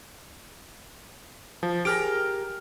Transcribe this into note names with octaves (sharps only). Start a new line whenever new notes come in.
F3
G4 G#4 A#4 F6 D7